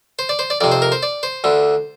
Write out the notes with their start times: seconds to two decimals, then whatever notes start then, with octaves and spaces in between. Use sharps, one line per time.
0.19 C5
0.29 D5
0.39 C5
0.50 D5
0.61 F2 C3 D5
0.72 C5
0.82 A#4
0.92 C5
1.03 D5
1.23 C5
1.44 D2 D3